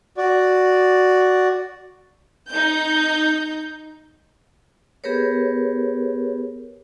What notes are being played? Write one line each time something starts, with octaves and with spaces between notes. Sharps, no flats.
F#4 D5
D#4 G6
B3 G4 G#4 A#4 B4 C#5